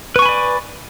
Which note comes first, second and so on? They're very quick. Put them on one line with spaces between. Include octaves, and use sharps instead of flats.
B4 C#6 G#5 B5 D5